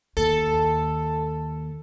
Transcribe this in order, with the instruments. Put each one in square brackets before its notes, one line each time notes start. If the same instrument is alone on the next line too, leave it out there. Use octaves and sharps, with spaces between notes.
[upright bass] D#2 [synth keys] A4